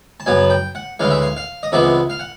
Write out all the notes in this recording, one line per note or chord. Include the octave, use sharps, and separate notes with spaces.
A5
F#2 C#3 F#3 B3 G#5
G5
F#5
D2 C#3 E3 G#3 F5
E5
F5
F5
D#5
C#2 C3 E3 G#3 B3 E5
F5
F#5